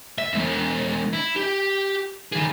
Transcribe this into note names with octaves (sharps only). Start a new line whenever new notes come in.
E5
E2 G#3
E4
G4
D#3 G#4